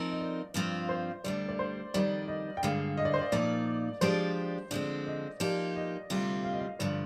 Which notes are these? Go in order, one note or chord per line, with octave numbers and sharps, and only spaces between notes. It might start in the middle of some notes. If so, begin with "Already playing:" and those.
Already playing: F3 C4 D#4 A#4 D#5
D#5
D5
G2 F3 C4 F4
C5
D2 D3 G3 D5
D5
C5
F2 D#3 G3 D5
D#5
G5
G2 D3 G#3 F5
D#5
D5
C5
D5
A#2 F3 A#3 D#4 D5
F3 G#3 D4 G4 C5 D5
D3 F3 G#3 C4 D5
D#5
F3 A#3 D#4 G4 D5
D#5
D2 C3 G3 C4 F4
F5
D#5
F5
G2 D3 F3 D5